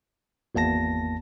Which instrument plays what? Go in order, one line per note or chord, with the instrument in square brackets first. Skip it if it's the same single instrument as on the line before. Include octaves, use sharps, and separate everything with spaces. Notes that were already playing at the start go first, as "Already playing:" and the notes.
[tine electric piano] G#1 E2 A#3 A5 A#6